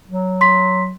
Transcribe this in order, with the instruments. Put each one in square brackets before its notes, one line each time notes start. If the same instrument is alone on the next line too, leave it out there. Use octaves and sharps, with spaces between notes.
[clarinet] F#3
[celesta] C6 B6